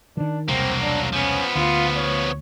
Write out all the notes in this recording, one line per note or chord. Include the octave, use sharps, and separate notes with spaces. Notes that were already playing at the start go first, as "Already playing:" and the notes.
D#3 E3 D4
E1 C2 F#3 A#3 C4
D4
F3 B3 C#4
D2 F4
C#5